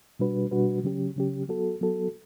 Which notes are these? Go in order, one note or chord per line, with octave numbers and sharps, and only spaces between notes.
B2 G3 D4 F#4 B4
B2 G3 D4 F#4 B4
C#3 F#3 C#4 G4
C#3 F#3 C#4 G4
F#3 B3 F#4 A4
F#3 B3 F#4 A4